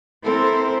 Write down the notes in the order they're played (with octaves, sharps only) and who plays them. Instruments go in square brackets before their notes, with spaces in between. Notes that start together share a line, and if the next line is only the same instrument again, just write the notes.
[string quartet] C4 E4 A4 A#4 C5